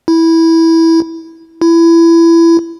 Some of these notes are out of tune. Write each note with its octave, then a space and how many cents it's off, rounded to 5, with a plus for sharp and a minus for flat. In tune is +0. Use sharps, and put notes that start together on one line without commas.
E4 -10
E4 +20